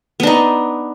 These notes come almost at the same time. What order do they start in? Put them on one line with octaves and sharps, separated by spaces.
B3 D4 D#4